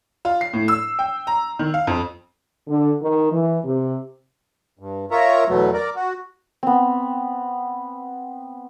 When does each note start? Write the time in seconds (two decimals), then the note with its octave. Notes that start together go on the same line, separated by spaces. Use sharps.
0.25 F4
0.41 C7
0.53 A2
0.68 E6
0.99 G5
1.27 A#5
1.59 D#3
1.74 F5
1.87 F2
2.67 D3
3.00 D#3
3.31 E3
3.64 C3
4.79 G2
5.11 F4 A#4 C#5 E5 A#5
5.49 E2 B2 F#3 A3 B3
5.74 A#4 D5
5.96 F#4
6.63 B3 C4